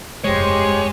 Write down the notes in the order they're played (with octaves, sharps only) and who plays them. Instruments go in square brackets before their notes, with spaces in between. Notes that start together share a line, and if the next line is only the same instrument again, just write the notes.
[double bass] F1 G2 [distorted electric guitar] G#3 [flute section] G4 C5 D6 [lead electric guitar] C#5